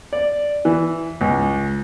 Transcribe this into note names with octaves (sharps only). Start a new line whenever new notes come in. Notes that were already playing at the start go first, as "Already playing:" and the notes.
D5
E3
C#2